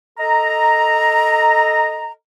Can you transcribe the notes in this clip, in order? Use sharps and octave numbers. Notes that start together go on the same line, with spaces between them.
A4 D#5 A#5